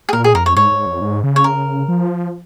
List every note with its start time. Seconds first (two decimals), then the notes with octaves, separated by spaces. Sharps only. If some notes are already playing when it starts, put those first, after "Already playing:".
0.09 G#4
0.13 A#2 A#4
0.24 G#4
0.34 F2 A#4
0.46 C#5
0.56 G#2 C#5
0.72 G#2
0.86 F2
1.02 G#2
1.23 C#3
1.36 C#5
1.44 A#4
1.88 F3